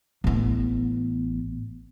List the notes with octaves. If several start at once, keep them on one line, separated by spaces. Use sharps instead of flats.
A1 B3